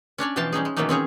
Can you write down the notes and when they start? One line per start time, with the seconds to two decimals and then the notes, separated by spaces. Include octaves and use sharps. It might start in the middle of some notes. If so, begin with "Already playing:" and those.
0.18 C#4 D4 C#5 D5
0.36 B2 E3 F3 F5 G5 A5
0.53 G3 C#4 D#4 G#4
0.65 G#3
0.77 B2 D#3 E3 F#3 A#3 D#4
0.89 C4 C#4 G#4 C#5